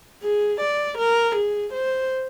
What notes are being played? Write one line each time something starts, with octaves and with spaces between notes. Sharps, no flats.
G#4
D5
A#4
G#4
C5